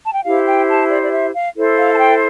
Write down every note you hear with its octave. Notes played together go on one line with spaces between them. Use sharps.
A5
G5
E4 G4 C5 F5
G5
A5
D5
D5
E5
F5
E4 A4 C5
F5
A5
G5